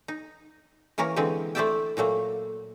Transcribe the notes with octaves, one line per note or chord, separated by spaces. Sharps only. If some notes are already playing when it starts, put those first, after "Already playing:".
D#4
E3 A#3 C#4 A#4 C#5
D3 E3 G#3 C4 G#4
A3 E4 C5 D5 E5 G5
A#2 F#3 A3 A#3